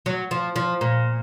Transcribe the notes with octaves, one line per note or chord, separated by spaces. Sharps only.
F#3
F3
F3
A#2